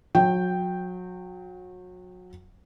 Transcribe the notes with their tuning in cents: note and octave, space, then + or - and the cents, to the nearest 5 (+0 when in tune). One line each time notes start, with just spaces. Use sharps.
F#3 -30 G5 +0